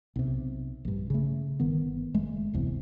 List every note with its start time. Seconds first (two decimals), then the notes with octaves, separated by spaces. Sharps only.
0.16 B1 C3
0.85 A#1 G2
1.10 C#3 A3
1.60 G1 D#3 B3
2.14 F#1 G#3 A3
2.53 D1 G1 E2 C3